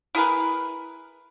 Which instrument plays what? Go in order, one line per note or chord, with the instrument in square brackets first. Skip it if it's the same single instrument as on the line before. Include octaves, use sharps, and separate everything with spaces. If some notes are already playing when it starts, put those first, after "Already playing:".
[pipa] E4 G#4 A#4 B4